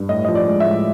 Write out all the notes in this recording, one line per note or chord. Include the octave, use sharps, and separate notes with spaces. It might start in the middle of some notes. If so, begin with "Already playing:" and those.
Already playing: G2
A2 D#5
F3 D#5
D5
G#3
E5
A2